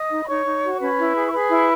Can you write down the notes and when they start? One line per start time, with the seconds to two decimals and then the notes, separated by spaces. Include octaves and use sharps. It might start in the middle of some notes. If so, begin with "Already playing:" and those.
Already playing: D#5 D#6
0.11 D#4
0.24 B5
0.28 D#4 C#5 C#6
0.46 D#4
0.64 F#4
0.80 C#4 B4 B5
0.98 E4
1.16 G#4
1.27 C#6
1.33 G#4 B4 B5
1.51 E4